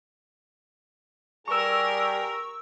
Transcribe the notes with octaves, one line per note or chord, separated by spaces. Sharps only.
G3 G4 G#4 A#4 C#6 E6